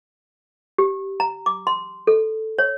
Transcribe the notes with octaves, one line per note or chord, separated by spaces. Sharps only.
G4
A#5
D6
C6
A4
C#5